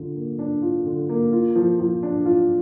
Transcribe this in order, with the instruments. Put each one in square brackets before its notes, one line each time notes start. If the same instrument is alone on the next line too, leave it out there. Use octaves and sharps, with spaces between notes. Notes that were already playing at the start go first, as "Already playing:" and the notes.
Already playing: [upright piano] D3 F4
A#3
D4
F4
D3
A#3
F4
F3
F3
D4
F4